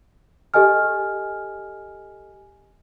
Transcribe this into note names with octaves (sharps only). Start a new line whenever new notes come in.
G4 A4 D#5 G#5 F6